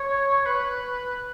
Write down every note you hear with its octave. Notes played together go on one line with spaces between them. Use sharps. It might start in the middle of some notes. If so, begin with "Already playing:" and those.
Already playing: C#5
B4